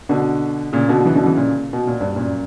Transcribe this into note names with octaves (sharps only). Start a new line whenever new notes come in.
B2 D3
A#2 C#3
B2 D3
C#3 E3
B2 D3
C#3 E3
A#2 C#3
B2
A#2
G2
F#2 A#2